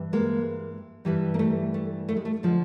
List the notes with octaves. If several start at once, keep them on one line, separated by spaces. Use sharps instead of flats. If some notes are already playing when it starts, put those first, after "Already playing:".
Already playing: G2 E3
G#3 A#3
G2 E3 G3
A#3
A3
A3
A3
G#3
A3
D3 F3 G#3